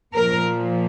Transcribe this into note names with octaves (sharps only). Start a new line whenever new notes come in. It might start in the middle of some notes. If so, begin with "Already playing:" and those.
A#2 F3 A#3 A#4